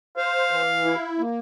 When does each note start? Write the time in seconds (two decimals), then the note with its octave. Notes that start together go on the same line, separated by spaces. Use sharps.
0.17 C5 F5
0.51 E3
0.85 E4
1.19 A#3